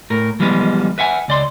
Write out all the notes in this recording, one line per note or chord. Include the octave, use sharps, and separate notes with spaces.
A2 A#4
E3 F3 G3 G#3 B3
B4 E5 F#5 G#5
C#2 D5 C6